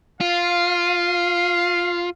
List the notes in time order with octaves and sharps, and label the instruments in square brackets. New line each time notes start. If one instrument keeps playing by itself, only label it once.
[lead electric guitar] F4 [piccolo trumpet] F5